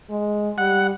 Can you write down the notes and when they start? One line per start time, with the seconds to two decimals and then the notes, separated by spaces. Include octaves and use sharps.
0.11 G#3
0.58 G3 F#5